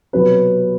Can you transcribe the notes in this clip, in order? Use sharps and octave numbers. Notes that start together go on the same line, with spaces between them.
C2 B2 F#3 B3 B4